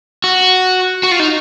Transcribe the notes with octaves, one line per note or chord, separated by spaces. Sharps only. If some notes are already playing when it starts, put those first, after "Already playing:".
F#4
F#4
F4
D#4